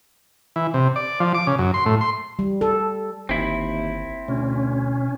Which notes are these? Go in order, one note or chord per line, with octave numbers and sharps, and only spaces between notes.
E3
C3
D5
F3
D6
C#3
F#2
C6
A2
C6
G3
A4
G1 D#2 C4 E4
D2 B2 C#4